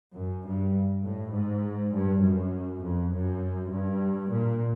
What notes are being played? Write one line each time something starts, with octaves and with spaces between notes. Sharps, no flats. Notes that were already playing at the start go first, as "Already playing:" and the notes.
F#2
G2
A2
G#2
G2
F#2
F2
F#2
G2
A#2